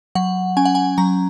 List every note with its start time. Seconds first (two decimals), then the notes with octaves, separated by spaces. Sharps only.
0.15 F#3 F#5
0.57 C#4 G#5
0.65 F#5
0.75 G#5
0.98 F#3 A#5